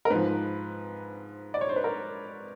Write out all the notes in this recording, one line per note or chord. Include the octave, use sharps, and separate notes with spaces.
A#4
G#2 F3 B4
D5
C#5
C5
B4
A#4